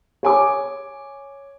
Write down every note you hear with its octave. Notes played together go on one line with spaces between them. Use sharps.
C#5 G#5 D6